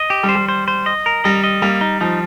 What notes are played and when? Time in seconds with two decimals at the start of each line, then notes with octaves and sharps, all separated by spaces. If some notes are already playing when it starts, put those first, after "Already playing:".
Already playing: D#5
0.10 G4
0.23 G3
0.29 C5
0.35 G3
0.49 C5
0.68 C5
0.86 D#5
1.06 A#4
1.24 G3 D#5
1.44 D#5
1.62 G3 A#3
1.81 D#4
2.01 F3 D#4